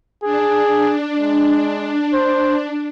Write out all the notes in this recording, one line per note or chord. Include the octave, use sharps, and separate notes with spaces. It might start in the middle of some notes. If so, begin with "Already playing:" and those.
D4 G#4
G#3
C5